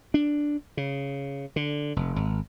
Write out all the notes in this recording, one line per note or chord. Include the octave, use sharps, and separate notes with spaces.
D4
C#3
D3
F1
G#1